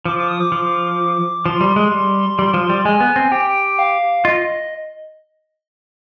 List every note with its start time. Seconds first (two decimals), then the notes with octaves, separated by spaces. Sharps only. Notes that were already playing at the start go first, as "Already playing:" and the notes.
0.05 F3 D6
0.18 D6
0.29 D#6
0.40 D6
0.52 F3
1.45 F3 C6
1.61 G3
1.76 G#3
1.92 G3
2.39 G3
2.54 F3
2.70 G3
2.85 G#3 G#5
3.00 B3
3.16 C4
3.32 G4 G5
3.79 F5
4.25 F4 D#5